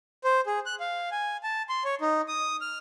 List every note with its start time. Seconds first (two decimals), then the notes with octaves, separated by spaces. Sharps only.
0.24 C5
0.46 G#4
0.66 F#6
0.80 F5
1.11 G#5
1.43 A5
1.69 C6
1.85 C#5
2.01 D#4
2.28 D#6
2.61 F6